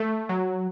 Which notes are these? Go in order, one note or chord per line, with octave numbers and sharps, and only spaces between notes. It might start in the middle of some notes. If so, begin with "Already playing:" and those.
Already playing: A3
F#3